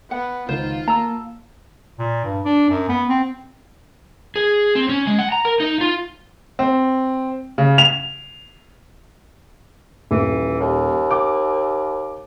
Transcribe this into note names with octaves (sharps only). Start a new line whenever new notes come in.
B3 F#5
C#2 D#3 D#4 F4 C5
A#3 A5 A#5 E6
A#2
G2
D4
F#2
B3
C4
G#4
C4
C#4
G#3
F#5
A#5
A#4
D#4
F4
C4
C#3
F7
D#1 E3
D#2
D6